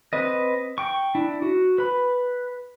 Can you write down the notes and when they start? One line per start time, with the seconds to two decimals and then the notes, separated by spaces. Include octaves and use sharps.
0.13 C4 B4 D#5
0.78 G5 C#6
1.15 D4 E4
1.42 F#4
1.78 B4 B5